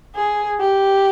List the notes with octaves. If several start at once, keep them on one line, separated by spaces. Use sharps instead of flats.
G#4
G4